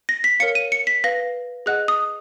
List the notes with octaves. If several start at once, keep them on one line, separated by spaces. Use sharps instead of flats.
A#6
B6
A#4 C#5 F5 C#7
D#7
C#7
B6
B4 F5 A#6
G#4 D#5 F#5 F#6
D#6